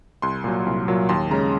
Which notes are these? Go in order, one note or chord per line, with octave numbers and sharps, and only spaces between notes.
C2 C6
A#2 F#3
C2
A#2 F#3
D#2 C6
C#3 G#3 C#4 A#5